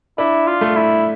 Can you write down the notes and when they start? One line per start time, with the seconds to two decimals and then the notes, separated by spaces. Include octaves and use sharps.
0.18 D4 E4
0.47 F4
0.61 A3
0.76 E4